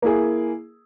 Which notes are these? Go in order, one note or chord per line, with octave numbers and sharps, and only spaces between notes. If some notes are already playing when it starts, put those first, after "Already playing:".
A#3 E4 G#4